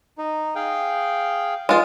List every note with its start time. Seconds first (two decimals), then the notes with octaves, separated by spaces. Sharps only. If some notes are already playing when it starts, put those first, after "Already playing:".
0.18 D#4
0.55 G#4 F5 G5
1.69 E3 G#3 F4